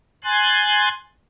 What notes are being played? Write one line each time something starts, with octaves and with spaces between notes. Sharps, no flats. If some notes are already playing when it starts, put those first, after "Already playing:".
G#5 C6 F#6 A6